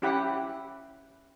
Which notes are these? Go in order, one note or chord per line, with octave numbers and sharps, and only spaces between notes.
C#4 E4 G4 F#5 B5